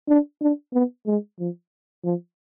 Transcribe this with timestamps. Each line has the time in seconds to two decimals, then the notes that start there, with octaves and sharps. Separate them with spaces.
0.08 D4
0.41 D4
0.73 B3
1.07 G#3
1.39 F3
2.04 F3